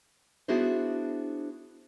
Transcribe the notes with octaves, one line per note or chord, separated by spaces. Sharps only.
B3 D4 E4 F#4 G#4 C5